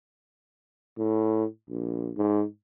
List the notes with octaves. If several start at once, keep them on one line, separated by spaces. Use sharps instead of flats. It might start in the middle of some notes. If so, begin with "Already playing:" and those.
A2
A#1
G#2